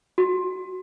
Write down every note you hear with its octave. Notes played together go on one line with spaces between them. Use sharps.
F#4